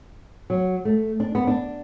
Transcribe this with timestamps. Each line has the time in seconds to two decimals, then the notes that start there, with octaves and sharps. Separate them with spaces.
0.50 F#3
0.85 A3
1.20 D4
1.35 B3
1.47 D4